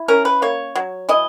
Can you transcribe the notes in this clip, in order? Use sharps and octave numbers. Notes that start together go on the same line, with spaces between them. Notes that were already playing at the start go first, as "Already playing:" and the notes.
Already playing: E4
C#4 A#4
B4
A#3 C#5
F#3
E3 D#5